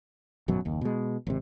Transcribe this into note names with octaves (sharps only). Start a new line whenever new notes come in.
G#1 F#2 B2 F#3
F#1 D#2
B2 G#3
G#1 C3